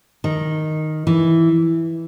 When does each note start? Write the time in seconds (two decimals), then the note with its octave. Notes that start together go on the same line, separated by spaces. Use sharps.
0.24 D#3
1.07 E3